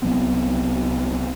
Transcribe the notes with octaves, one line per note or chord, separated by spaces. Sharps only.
C2 F#3 B3 C4